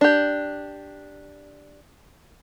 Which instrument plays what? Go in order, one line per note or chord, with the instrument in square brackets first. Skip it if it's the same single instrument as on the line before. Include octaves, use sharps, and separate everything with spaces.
[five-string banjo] D4 G4